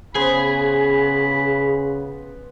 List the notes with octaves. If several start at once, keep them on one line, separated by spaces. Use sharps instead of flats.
C#3 B3 G#4 C5 B5